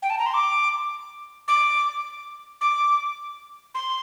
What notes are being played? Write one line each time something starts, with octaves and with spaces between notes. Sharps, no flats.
G5
A5
A#5
C6
D6
D6
D6
C6